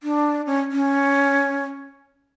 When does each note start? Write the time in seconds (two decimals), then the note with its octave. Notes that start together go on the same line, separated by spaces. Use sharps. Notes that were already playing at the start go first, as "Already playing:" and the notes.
0.03 D4
0.46 C#4
0.72 C#4